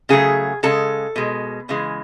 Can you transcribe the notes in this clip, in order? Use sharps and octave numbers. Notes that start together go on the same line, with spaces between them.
C#3 F#3 A3 G#4
C#3 G#3 A4
B2 G#3
C#3 E3 G#3